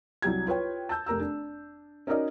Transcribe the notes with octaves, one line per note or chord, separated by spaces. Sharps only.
C2 F#3 G4 G#6
F4 B4 C#5 G5
A5 E6 G6
F1 A#4 A#5 E6
D4
C#4 D#4 F#4 A#4 D5 D#5